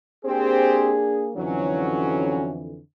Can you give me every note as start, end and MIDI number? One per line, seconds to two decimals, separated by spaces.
0.25 1.31 58
0.25 0.95 60
0.25 1.31 62
0.25 0.95 67
0.25 1.31 68
0.25 0.95 72
1.36 2.79 41
1.36 2.79 50
1.36 2.79 52
1.36 2.51 54
1.36 2.51 61